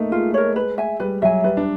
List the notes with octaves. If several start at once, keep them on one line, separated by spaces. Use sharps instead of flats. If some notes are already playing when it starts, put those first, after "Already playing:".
Already playing: A3 A#3 D#4
G#3 F4
A#4 C#5
B4
E5 G#5
G3 B4
F#3 E5 G#5
G3 B4
D4